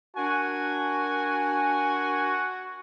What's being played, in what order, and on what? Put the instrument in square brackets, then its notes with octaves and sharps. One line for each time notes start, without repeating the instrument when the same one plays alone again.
[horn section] D4 A#4 G#5 [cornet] F#4